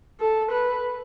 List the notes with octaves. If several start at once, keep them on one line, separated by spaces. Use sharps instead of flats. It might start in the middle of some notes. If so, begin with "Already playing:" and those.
A4
B4